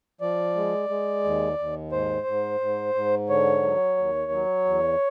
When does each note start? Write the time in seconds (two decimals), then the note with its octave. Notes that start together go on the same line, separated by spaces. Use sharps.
0.21 F3 D5
0.56 G#3
0.89 G#3
1.24 D#2
1.59 D#2
1.92 G#2 C5
2.27 G#2
2.60 G#2
2.95 G#2
3.29 D3 C#5
3.63 F#3
3.97 D#2
4.32 F#3
4.65 E2